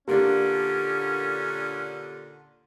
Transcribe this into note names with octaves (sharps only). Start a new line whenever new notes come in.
A#2 D3 A#3 C#4 D4 G4